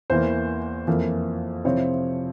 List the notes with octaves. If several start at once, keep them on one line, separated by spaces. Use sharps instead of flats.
E2 E3 A#3 C5
F2 E3 A#3
C3 F3 C4 E4 C#5